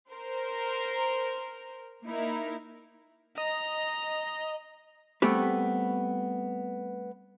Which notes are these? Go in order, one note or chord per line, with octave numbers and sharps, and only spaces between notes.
A#4 C5
A#3 D#4 E4 A#4
D#5 A#5
G3 A3 B3 C4 G4 B4